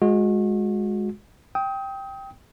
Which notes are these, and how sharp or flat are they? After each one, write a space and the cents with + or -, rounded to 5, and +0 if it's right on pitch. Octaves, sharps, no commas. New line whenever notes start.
G#3 +0 F#4 -35
G5 +0 D#6 +35